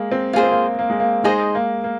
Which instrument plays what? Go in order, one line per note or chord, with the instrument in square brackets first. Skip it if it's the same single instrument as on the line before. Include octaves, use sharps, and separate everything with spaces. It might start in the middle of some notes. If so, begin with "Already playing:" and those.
Already playing: [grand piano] G#3 A#3
C4
[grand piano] A#3 [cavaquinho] F4 G#4 C5
[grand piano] C4
A#3
A#3
G#3
A#3
[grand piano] G#3 [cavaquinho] D#4 G#4 C5 D#5
[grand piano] A#3
A#3